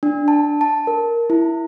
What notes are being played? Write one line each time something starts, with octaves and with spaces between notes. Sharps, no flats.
D4
A5
A5
A#4
E4